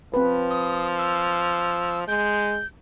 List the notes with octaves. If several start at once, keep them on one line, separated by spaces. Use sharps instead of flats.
F3 C4 B4
D#6
E6
G#3 G6